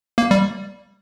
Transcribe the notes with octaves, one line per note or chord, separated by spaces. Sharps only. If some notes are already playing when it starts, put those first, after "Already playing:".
A#3
G3